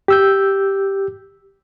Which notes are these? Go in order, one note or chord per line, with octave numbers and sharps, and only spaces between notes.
G4 E6 G6